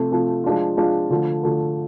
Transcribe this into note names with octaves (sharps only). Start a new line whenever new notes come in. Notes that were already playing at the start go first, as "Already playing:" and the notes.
Already playing: C3 F3 A3
C3 F3 A3
F3 G#3 D4 F4
F3 G#3 D4 F4
D3 F3 A3
D3 F3 A3